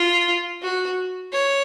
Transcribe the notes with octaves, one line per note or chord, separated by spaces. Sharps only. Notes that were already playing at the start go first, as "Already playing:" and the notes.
Already playing: F4
F#4
C#5